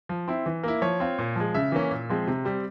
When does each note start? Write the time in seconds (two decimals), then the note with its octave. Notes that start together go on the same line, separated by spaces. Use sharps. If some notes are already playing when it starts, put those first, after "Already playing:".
0.09 F3
0.28 C4 E4
0.46 E3
0.63 A#3 E4
0.82 F3 C#5
1.00 C4 F4
1.18 A#2
1.36 F3 G#3
1.54 C#3 E5
1.72 E3 A#3 C#4
1.91 A#2
2.09 F3 G#3 C4
2.27 C3
2.45 G3 C4